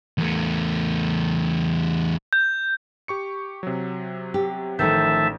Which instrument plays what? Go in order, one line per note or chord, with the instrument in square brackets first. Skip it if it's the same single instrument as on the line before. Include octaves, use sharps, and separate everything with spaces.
[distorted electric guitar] E2 A3
[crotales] G6
[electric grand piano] G4 C#6 C#7
C3 F#3
[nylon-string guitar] G4
[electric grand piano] A1 G6 [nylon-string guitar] D#3 F3 A3 [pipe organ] E5 A5